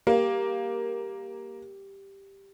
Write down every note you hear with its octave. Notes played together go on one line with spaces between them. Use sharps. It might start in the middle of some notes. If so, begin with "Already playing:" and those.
A#3 G4